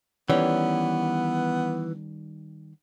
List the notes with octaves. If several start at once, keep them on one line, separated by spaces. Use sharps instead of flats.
D#3 E3 G3 B3 C#4